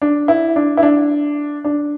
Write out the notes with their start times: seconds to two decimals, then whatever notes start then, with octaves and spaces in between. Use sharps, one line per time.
0.02 D4
0.28 E4
0.56 D4
0.77 E4
0.83 D4
1.64 D4